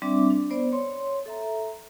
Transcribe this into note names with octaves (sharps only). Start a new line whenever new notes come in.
G3 C4 D4 D5 E5 D6
D4
B3 C5 D5
C#5 C6
A4 E5 A#5